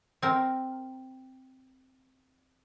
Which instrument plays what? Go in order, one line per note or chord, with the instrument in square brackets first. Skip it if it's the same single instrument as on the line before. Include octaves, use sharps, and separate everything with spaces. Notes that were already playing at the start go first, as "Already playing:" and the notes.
[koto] C4 A#4